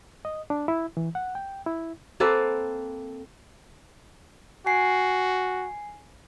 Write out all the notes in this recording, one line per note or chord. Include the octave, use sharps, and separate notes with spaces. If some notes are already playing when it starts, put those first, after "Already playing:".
D#5
D4
E4
E3
F#5
G5
E4
A#3 C4 A4 B4
F#4 G#5 C7